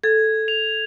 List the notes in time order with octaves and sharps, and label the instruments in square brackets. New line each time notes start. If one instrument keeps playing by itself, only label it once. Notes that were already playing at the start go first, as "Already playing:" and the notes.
[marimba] A4 [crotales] G#6
[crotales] F7